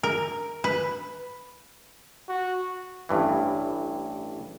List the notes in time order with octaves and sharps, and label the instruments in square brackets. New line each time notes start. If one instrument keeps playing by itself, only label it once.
[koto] A#4
B4
[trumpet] F#4
[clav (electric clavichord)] A1 G2 E3